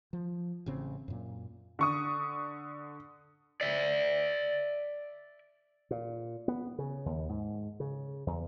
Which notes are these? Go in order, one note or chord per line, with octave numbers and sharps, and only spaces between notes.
F3
A1 C#3 C4
F#2 A#2
D3 C#6 D#6
D5 E5
A#2
B3
C#3
D#2
G#2
C#3
E2